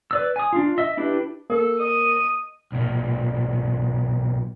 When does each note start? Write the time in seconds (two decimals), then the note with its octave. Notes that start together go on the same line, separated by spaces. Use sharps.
0.11 B4 D5 E6
0.36 G#5 D#6
0.53 D4 F4
0.78 D#5 E5 E6
0.97 D4 E4 G4 B4
1.50 A#3 A4 A#4
1.80 D#5 D#7
2.72 B1 A#2